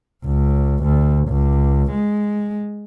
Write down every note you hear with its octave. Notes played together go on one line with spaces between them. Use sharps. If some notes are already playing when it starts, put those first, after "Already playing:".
C#2
D2
C#2
G#3